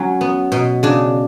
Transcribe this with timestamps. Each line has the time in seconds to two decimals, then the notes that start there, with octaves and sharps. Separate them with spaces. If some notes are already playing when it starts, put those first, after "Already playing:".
Already playing: F#3 C#4
0.21 B3
0.52 B2
0.83 C#3 D4